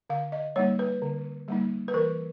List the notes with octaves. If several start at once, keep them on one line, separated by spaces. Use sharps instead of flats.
D3 F5
D#5
G3 A#3 D#4 C#5
B4
D3
G3 A#3 D#4
B4
E3 A#4